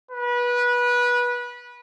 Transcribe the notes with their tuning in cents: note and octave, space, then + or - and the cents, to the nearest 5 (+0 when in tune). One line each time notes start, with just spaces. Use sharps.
B4 -20